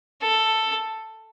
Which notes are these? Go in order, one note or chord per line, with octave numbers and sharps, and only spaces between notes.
A4